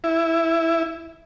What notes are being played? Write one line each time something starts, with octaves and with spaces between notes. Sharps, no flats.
E4